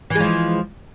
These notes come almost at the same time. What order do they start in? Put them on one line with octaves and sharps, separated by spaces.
E3 G#3 F3